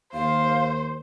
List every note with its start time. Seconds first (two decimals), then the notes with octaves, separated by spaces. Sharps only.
0.13 D#2 C5 F5